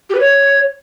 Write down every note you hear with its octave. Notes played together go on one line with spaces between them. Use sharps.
G4
B4
C#5